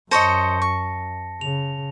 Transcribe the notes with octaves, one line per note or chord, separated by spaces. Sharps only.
F#2 C5 C#5 D#5 A5 A#6 C#7
C#6
C#3 F7